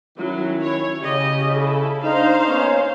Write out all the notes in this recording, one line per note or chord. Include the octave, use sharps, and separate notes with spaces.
D#3 F#3 C#4 E4
C#5
C#3 G4 D#5
E4 A4
D4 D#4 C5 F5
A#3 B3 C#4